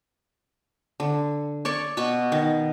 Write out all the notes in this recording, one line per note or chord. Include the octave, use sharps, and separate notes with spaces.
D3
C#5 D5 C#6
B2 B5 C#6
D#3